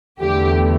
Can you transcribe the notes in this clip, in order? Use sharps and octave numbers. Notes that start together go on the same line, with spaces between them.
E2 D3 A3 E4 G4